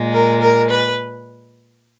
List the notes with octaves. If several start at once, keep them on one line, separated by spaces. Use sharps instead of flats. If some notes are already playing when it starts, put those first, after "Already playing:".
Already playing: A#2 G#3
A#4
A#4
B4